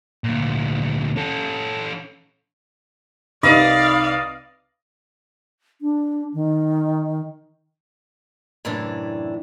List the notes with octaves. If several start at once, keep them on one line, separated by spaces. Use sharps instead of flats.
D2 A#2
C#4 A4
C2 D#4 B4 D5 D#5 F5 B5
D4
D#3
F#2 A2 C3 E3 D4